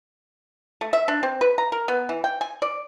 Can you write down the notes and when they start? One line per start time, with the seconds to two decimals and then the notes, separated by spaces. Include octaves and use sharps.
0.81 A3
0.93 E5
1.08 D4
1.23 C4
1.41 B4
1.58 A#5
1.72 A#4
1.88 B3
2.09 E3
2.24 G5
2.41 G#5
2.62 D5